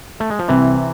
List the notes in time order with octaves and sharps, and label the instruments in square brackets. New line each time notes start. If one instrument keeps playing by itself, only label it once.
[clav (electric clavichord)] A3
G#3
F3
[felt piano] C2 [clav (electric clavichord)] C3 E3